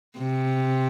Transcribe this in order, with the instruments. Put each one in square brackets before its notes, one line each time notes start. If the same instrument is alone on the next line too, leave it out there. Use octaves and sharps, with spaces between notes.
[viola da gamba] C3